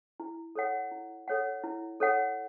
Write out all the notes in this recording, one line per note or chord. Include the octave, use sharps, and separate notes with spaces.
E4
A4 C#5 F#5
E4
A4 C#5 F#5
E4
A4 C#5 F#5